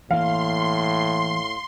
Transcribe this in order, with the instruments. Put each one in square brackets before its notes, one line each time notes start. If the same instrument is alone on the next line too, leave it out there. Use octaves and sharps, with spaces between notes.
[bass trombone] A2 [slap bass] E3 A#3 [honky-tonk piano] F5 [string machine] C6